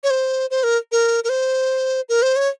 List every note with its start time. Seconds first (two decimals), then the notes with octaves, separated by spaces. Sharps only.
0.03 C#5
0.10 C5
0.50 C5
0.63 A#4
0.92 A#4
1.24 A#4
1.29 C5
2.09 A#4
2.22 C5
2.36 C#5